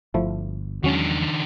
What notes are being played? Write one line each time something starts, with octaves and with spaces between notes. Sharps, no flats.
G1 F3 A3 E4
E2 D#3 F#3 G#3 C#4 D4 F#4